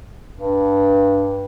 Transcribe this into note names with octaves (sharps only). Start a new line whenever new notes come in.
G2